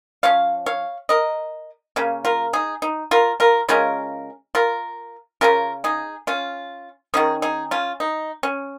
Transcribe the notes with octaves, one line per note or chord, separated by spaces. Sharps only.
F3 C#4 C#5 F5
C#5 F5
A#4 D#5
C#3 A#3 C#4
F4 A#4
D#4 G#4
D#4
F4 A#4
F4 A#4
C#3 G#3 C#4 F4 A#4
F4 A#4
C#3 G#3 C#4 F4 A#4
D#4 G#4
C#4 F4
D#3 A#3 C#4 D#4 G#4
D#4 G#4
C#4 F4
D#4
C#4